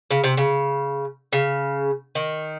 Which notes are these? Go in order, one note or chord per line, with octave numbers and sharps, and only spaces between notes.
C#3
C3
C#3
C#3
D#3